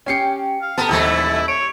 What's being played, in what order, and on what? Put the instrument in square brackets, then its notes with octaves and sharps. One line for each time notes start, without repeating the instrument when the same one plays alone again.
[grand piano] C#4 C7 C#7 [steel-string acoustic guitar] G4 G5 G#5
[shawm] F5
[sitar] B3 [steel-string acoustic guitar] G4 A4 [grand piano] A5 A#5
[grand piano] D#1 [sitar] G#2 E3 A3 [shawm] E4
[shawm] C#5 [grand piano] D7